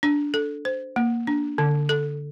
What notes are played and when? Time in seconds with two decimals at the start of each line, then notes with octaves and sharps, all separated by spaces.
0.03 D4
0.34 A4
0.65 C5
0.96 A#3
1.27 D4
1.58 D3
1.89 A4